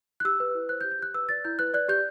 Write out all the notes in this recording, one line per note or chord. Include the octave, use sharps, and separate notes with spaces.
F#6
G4 E6
B4
E4
C5 F#6
G6
G4
G6
G4 F#6
B4 E6
D5 A6
E4 G6
B4 F#6
D5 F#6
G4 G6